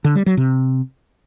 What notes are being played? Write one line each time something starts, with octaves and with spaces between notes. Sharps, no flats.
D3
G3
F#3
C3